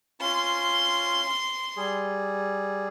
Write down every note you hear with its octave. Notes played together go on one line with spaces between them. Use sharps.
C#4 F4 C6
G3 G#4